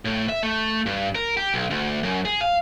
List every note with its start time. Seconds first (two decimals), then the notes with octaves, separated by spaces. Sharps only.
0.05 A2
0.29 E5
0.43 A3
0.86 G2
1.15 A#4
1.37 G4
1.54 B1
1.71 D2
2.03 F#2
2.25 G#4
2.41 F5